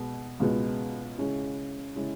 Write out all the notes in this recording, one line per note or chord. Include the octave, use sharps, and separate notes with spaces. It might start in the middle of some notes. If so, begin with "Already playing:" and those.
Already playing: B2 G#3 B3
C#2 B2 G#3 B3
C#3 G#3 C#4 E4
C#3 G#3 C#4 E4